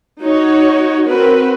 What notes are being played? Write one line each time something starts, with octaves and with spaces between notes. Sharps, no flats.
D#4 F#4 C#5
C4 F#4 A#4 B4